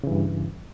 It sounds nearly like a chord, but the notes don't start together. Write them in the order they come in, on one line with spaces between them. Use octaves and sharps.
C#3 E3 G2